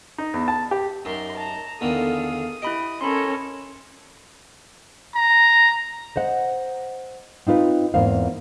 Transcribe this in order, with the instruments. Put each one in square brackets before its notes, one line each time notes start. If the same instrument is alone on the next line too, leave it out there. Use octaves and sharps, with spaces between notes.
[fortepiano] D#4
E2
A5
G4
[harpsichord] F#2 [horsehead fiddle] D#4 [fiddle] A#4 C6
[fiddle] A5 A#5
[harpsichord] E2 D3 D#3 [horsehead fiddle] A4 F5 [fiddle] D#6
[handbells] E4 B5 D7 [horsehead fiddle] G4 [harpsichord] D#5
[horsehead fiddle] C#4 C#5 [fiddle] A4 A#4 [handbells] B5 C6
[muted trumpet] A#5
[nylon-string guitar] C5 D#5 F#5
C4 D#4 F4 B4
E2 G#2 A#3 C4 F5